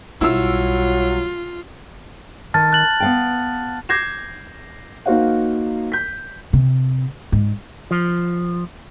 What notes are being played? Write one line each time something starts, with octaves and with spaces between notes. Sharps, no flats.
B1 F#3 G3 E4 F4 E6
D#3 A5 F6 A6
F#6 A6 F#7
B3 F5 G5
D6 G6 G#6 A#6 C7 E7
A#3 D#4 F#4 C5 F5 F#5
G6 B6
C3
G#2
F3